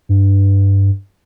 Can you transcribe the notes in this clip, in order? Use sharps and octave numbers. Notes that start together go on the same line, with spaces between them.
G2